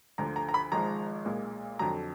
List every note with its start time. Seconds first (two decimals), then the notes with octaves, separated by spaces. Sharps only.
0.18 D2 D3 F3 A#5
0.36 A#5
0.49 A#5
0.54 B5
0.72 G#1 G#2 F3 G#3 A#5
1.25 B1 A#2 G#3
1.79 F2 D3 F#3 A#5